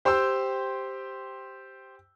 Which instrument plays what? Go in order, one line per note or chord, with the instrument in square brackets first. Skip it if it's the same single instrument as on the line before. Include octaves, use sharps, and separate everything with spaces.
[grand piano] G4 C5 G5 C6 E6